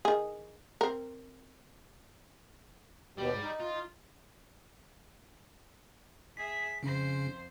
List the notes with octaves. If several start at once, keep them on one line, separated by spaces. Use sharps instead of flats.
D#3 G#4
C4 A#4
D#2 B2 G3 G4
G#2
D#4
F4
G#4 E5 B6
F2 C#3 C#4 C5